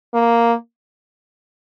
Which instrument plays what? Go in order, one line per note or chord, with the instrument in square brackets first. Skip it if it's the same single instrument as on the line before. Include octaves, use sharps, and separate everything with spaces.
[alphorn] A#3